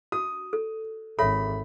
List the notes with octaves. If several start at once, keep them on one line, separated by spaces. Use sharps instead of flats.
F#4 D#6
A4
G#1 A4 C#5 E5 B5